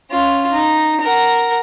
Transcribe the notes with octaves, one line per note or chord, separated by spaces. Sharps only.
C#4 F4
D#4
A#4 F#5